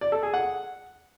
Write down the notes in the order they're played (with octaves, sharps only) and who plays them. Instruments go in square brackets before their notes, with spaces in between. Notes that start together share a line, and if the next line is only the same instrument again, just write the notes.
[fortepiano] D5
A4
G#4
F#5